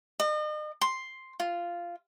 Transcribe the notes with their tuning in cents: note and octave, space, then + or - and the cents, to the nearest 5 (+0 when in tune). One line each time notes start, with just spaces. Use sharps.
D#5 -40
C6 +5
F4 -10